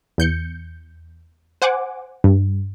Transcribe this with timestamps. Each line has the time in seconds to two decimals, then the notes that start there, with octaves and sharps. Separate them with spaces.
0.18 E2 G6 C#7
1.62 C5 F#5 G#5 D6
2.24 G2